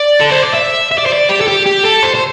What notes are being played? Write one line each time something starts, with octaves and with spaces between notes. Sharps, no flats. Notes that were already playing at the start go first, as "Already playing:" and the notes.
Already playing: D5
A4
C5
D5
E5
E5
D5
C5
D5
G4
A4
G4
G4
A4
C5
C5